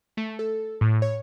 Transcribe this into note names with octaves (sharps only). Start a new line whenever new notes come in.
A3
A4
A2
C#5